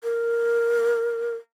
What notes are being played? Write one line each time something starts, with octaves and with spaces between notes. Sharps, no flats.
A#4